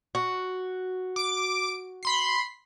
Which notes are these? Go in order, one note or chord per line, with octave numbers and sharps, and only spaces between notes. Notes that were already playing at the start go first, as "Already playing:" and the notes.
F#4
D6 D7
B5 C6 C7